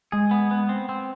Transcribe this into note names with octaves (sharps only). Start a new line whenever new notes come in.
G#3 G#4
B3
B3
C4
C4